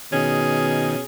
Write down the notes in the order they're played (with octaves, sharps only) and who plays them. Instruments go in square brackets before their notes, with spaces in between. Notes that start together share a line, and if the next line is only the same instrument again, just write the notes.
[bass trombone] B2 [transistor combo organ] D#3 [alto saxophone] C#4 [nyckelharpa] G#4